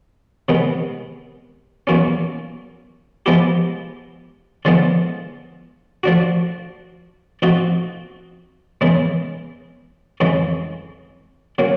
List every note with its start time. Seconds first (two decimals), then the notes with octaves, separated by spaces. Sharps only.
0.49 C3 D#3 G#3 B3
1.87 E2 B2 F#3 A#3 C#4
3.26 F3 G#3 B3 E4 G4
4.65 D3 F3 G#3 B3 E4
6.03 F3 A3 D4 F#4
7.42 F3 A3 C4 D#4 F#4
8.81 E2 C#3 E3 G#3
10.20 F2 C#3 E3 G#3
11.58 C#3 F#3 A#3